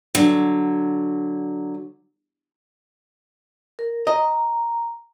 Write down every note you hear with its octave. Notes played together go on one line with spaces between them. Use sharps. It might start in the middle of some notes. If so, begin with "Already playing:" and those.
D3 F#3
A#4
D#5 A#5